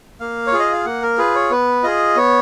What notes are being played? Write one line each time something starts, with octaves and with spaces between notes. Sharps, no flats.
A#3 F5
C#5
F4 G#4
D#5
F5
A#3 F#5
A#4
F4 G#4 B4
C#5
B3 B4
F4 G#4 D#5
B3 C#5